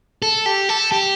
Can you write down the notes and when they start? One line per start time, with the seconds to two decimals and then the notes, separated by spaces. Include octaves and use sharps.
0.22 A4
0.46 G4
0.69 A4
0.92 G4